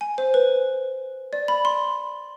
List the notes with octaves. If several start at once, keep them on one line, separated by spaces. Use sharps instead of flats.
G#5
C5
B4
D5
B5
C6